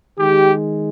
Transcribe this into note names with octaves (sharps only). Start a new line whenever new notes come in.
D#3 G#3 G4